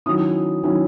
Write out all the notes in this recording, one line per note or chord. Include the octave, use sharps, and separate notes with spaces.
D#3 F#3 C#4 E4 D#6
D#3 F#3 C#4 E4